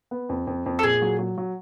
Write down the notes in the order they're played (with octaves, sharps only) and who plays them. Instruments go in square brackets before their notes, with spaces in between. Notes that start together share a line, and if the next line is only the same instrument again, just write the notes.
[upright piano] B3
F2
F2
F2
[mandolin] A4
[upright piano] A#2 [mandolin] G#4
[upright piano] F#3
F#3
F#3